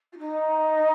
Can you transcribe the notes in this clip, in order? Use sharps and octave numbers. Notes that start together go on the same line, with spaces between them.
F4
D#4